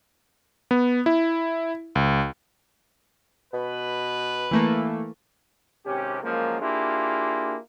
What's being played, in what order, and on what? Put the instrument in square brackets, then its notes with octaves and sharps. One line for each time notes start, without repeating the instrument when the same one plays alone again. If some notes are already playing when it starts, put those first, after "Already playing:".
[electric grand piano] B3
E4
C#2
[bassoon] B2 [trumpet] B4
[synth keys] E3 A3 A#3
[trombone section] G#1 C3 C#4 G4
F#2 F3 G#3 A#3
A#3 D4 E4 F4 G4 G#4